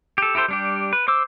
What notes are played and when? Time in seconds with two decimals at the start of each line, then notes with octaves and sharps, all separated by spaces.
0.18 G4 A4
0.35 E4 G4 A4 C5
0.48 G3 D4 G4
0.93 B4
1.08 C5 D6 E6